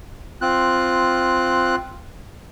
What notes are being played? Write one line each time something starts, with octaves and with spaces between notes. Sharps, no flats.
C4 F4 F#6